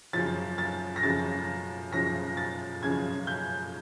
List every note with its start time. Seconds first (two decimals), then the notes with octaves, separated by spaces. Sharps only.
0.13 F#2 C#3 F3 A6
0.58 A6
0.96 A#6
1.02 F#2 C#3 F3 A6
1.93 F#2 C#3 F3 A#6
2.37 A6
2.82 F#2 C#3 F3 G#6
3.27 G6